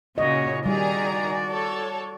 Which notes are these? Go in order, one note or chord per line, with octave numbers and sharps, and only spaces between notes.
A#2 C#3 F#4 C#5 D#5
D#3 G3 F#4 G#4 D5 A#5
A4 C#5